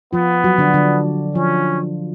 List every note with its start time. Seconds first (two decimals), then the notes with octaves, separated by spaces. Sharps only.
0.13 F3 B3 F4
0.44 F#3 F#4
0.58 D3 D4
0.74 D3 D4
1.35 F3 C#4 F4